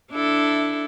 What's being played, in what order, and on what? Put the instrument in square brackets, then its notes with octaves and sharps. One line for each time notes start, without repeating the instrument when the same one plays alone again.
[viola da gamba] D4 E4 A4